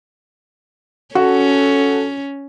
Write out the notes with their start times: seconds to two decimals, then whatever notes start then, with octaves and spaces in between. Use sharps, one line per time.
1.15 C#4 F#4 A4